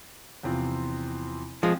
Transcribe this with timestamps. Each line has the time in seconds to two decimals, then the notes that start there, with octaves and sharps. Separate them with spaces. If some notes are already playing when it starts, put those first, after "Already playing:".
0.43 E2 C3 F3 C4 F4
1.63 F3 G#3 C4